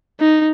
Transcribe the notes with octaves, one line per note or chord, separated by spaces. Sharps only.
D#4